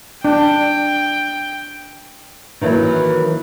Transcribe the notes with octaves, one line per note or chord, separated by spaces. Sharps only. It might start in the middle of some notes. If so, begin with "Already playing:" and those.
D4 G5
D#3 E3 F#3 A#3 E4